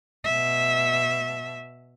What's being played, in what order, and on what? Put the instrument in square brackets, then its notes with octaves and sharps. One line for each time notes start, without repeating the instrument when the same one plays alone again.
[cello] B2 E5